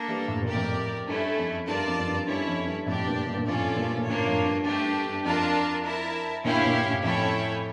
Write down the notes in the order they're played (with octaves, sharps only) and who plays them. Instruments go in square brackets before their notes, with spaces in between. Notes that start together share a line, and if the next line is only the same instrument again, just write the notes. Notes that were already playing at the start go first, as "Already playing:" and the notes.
Already playing: [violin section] A#3 D4 A4
[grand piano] E3 G3
A2
A#2
[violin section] G4 A#4 D5
[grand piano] F2 A2
[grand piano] G2 [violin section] A3 C#4 E4
[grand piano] F2
[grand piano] G2 [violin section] F4 A#4 D5 A5
[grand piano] F2
F2
G2
[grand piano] G2 [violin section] C#4 E4 A4 C#5
[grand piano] F2
G2
[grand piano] F2 A2 [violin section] D4 G4 D5
[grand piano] G2 A#2
G2 A#2
A#2
[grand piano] F2 A2 [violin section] C#4 F4 A4 D5
[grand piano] G2 A#2
A#2
[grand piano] A2 C#3 [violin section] A#3 D4 F4 C#5
[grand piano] F2 A2
G2
[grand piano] G2 [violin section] A3 D4 G4
[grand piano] G2
G2
[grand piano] F2 [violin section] D4 F4 A#4 D5 A5
[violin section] E4 A#4 E5 A5
[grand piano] A#2 D3 [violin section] C#4 E4 G4 C#5 F5
[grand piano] A#2 D3
A2 C#3
[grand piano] F2 A2 [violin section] C#4 E4 A4 C#5 G5